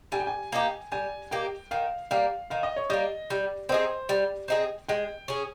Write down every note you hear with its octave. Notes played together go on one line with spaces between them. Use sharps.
G3 G#5
G5
G#5
A#3 D#4 G4
G3 G#5
A#3 D#4 G4 G5
D#3 F5
G3 A#3 F5
D#3 F5
D#5
C#5
G3 A#3 D#5
G3
C4 D#4 G#4 C5
G3
C4 D#4 G#4
G#3 G5
C#4 G#4